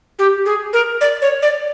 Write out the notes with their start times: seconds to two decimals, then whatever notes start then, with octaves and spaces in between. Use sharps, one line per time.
0.19 G4
0.46 G#4
0.73 A#4
1.01 D5
1.22 C#5
1.42 D5